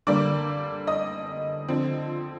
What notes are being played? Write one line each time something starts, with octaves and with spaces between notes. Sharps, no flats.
D3 G3 A#3 D5 D6
D#5 D#6
D3 F3 C4